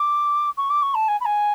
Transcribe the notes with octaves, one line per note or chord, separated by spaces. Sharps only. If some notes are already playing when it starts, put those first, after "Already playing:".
Already playing: D6
C#6
D6
C#6
A5
G#5
B5
G#5